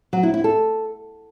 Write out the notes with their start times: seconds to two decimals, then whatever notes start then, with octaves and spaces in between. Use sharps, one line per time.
0.13 F#3
0.23 E4
0.34 E4
0.44 A4